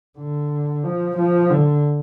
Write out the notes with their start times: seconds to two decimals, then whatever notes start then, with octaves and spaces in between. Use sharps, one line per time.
0.18 D3
0.84 F3
1.17 F3
1.51 D3